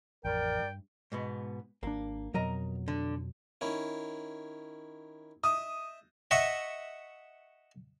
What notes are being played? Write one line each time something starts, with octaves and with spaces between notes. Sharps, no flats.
A1 F2 A#4 D5 G5
G2
G#2 B2 B3
G#1 A#3 D4
F2 B2 F#3 A#4 D#5 A#5
D3
D#3 C#4 E4
D#5 E5 D#6
D#5 E5 F#5 C#6